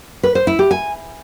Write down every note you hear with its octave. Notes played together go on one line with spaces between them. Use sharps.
B4
C5
E4
G4
G#5